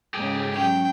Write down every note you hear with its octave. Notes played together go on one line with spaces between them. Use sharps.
G#2 C#3 G4 G#4
F#3 C#4 G5